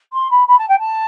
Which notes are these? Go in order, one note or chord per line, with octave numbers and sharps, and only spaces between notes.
C6
B5
B5
A5
G5
A5